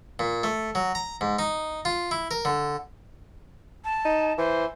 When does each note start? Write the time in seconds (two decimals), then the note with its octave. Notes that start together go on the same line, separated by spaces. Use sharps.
0.19 A#2
0.44 A3
0.75 F#3
0.95 A#5
1.21 G#2
1.39 D#4
1.85 F4
2.11 E4
2.31 A#4
2.45 D3
3.84 A5
4.05 D#4
4.38 E3 C5